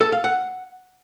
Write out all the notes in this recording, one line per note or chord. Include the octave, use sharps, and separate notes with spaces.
A4
F5
F#5